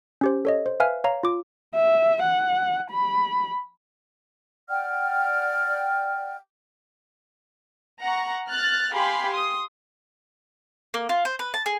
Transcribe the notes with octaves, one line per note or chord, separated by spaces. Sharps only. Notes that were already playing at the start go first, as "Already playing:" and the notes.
C#4 G4 C5
A4 C#5 D#5
C5
B4 E5 F5 G#5 F6
C#5 F5 A#5
F4 D6
E5
F#5
B5
D5 F#5 G5 F6
F#5 A#5 C#6
F6 F#6 A6
G4 F5 G#5 B5 C6
C6 D#6
A#3
F4
C5
B4
A5
G#4